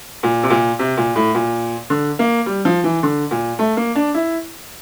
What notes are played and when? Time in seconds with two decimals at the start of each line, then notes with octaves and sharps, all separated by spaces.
0.23 A#2
0.43 C3
0.50 A#2
0.79 C3
0.97 A#2
1.16 A2
1.35 A#2
1.90 D3
2.19 A#3
2.46 G3
2.65 F3
2.84 E3
3.03 D3
3.31 A#2
3.59 A3
3.77 A#3
3.96 D4
4.14 E4